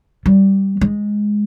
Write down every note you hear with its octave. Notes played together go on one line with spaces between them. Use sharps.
G3
G#3